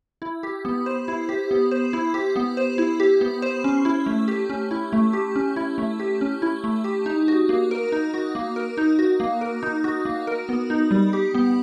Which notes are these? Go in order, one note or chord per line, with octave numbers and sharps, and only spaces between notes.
E4
G4
B3
C5
E4
G4
B3
C5
E4
G4
B3
C5
E4
G4
B3
C5
C#4
E4
A3
G4
C#4
E4
A3
G4
C#4
E4
A3
G4
C#4
E4
A3
G4
D#4
F#4
A#3
A#4
D#4
F#4
A#3
A#4
D#4
F#4
A#3
A#4
D#4
F#4
A#3
A#4
B3
D#4
G3
G4
B3